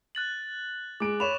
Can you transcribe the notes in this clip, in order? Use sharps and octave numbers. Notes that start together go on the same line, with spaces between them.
F#6 A6 F#7
G#3 D6 D7
C#5 B5 C#6 E7 F7